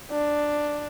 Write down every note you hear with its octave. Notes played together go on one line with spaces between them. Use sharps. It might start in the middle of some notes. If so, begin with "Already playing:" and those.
D4